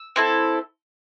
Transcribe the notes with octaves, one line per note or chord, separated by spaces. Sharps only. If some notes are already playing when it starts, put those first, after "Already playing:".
Already playing: E6
C4 E4 A4